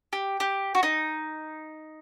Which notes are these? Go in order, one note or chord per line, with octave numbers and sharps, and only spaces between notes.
G4
G4
F#4
D#4